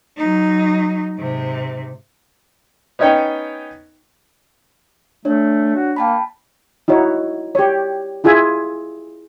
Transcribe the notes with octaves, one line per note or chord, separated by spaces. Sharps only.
F#3 D#4
G#2 C3
B3 C#4 D#4 C#5 G5
A3 D4 C#5
F#4
A#3 G5 A5 B5
D#4 E4 F#4 C#5
G4 C#5
E4 F4 G#4 E5 G#5